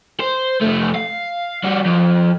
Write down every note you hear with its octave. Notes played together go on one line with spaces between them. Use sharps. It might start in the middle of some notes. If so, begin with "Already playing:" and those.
C5
F2 A3
F5
G3 F#4
F2